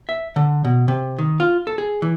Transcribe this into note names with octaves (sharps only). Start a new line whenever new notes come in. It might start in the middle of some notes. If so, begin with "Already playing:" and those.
E5
D3
B2
C3
D#3
F4
A4
G#4
E3